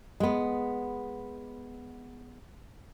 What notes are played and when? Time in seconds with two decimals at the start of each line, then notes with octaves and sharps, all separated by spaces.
0.20 G#3 B3